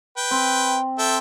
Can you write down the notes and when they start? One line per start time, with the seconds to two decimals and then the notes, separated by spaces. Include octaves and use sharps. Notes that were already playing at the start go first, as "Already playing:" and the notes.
0.17 B4 G5
0.31 C4
0.99 A4 E5 G5